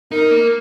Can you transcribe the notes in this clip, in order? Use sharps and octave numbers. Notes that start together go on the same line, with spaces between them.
D#4 A#4
A#3